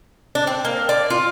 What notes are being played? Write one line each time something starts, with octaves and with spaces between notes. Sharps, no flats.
D4
C4
A#3
D5
F4